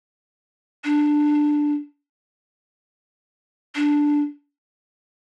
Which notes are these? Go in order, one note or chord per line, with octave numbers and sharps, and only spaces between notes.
D4
D4